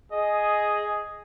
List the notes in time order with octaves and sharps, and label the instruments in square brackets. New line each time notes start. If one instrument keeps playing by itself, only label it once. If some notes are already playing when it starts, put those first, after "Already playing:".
[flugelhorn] G#4 [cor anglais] D#5